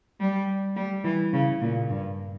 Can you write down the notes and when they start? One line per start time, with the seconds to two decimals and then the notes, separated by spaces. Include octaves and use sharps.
0.20 G3
0.76 G3
1.04 E3
1.33 C#3
1.61 A#2
1.90 G2